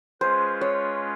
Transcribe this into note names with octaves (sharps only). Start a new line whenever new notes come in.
G#3 C#4 F4 G#4 B4 C5
C#5